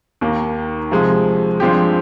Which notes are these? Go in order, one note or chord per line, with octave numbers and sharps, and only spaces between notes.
D#2 D#3 A#3
C3 F3 G#3
G2 F3 G#3 C4 G4